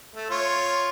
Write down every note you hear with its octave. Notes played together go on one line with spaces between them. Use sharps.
A3
F4 C#5